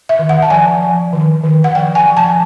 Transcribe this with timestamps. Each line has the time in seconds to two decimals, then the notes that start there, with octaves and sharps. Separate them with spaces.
0.09 E5
0.19 D#3
0.29 F#5
0.42 A5
0.50 F3 G#5
0.82 F3
1.13 D#3
1.44 D#3
1.64 F#5
1.75 F3 G5
1.95 G#5
2.06 F3
2.17 A5